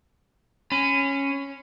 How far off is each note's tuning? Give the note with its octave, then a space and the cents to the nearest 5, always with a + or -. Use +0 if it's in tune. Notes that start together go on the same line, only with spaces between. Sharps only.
C#4 -5 B5 +35